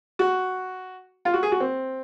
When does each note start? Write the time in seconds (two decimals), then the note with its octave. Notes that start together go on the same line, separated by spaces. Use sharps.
0.19 F#4
1.25 F4
1.34 F#4
1.43 G#4
1.52 F#4
1.60 C4